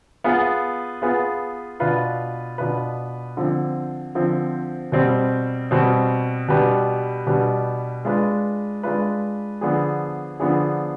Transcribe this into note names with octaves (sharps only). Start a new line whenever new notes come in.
B3 F4 G#4 B4
B3 F4 G#4 B4
B2 B3 D4 F4 B4
B2 B3 D4 F4 B4
D3 F3 C4
D3 F3 C4
B2 G3 C4
B2 G3 C4
B2 G3 D4 G4 B4
B2 G3 D4 G4 B4
G#3 D4 F4 B4
G#3 D4 F4 B4
D3 F3 B3 D4 G#4
D3 F3 B3 D4 G#4